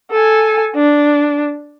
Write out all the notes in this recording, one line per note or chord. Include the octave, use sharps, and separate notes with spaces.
A4 G#5
D4